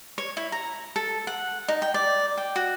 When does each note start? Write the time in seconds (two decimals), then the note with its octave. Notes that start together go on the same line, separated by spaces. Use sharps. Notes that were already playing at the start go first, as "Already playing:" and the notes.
0.18 C#5
0.37 E4
0.52 A#5
0.96 A4
1.27 F#5
1.68 D#4
1.82 G5
1.94 D5
2.37 G5
2.56 F#4